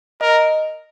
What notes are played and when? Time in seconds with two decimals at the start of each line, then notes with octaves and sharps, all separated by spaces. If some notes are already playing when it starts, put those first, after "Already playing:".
0.21 A#4 D#5